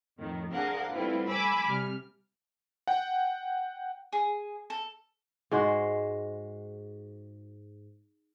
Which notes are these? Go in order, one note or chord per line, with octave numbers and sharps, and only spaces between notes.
F2 A2 D#3
D4 G#4 A#4 C5 F5 F#5
G3 A3 B3 C4 E4 F4
G#5 B5 D6 E6
C3 G3 F6
F#5 G5
G#4
A4
G#2 G#3 F#4 C5